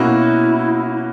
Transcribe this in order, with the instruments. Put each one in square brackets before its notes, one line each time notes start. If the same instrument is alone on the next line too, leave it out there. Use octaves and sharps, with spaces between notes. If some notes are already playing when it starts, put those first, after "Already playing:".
Already playing: [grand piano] B2 A#3 C#4 F#4 [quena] E4